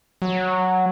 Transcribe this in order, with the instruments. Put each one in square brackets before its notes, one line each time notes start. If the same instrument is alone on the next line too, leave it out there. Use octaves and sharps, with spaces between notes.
[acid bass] F#3